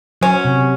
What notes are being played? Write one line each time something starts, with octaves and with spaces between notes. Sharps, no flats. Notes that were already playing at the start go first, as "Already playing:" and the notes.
F#3 C#4
C3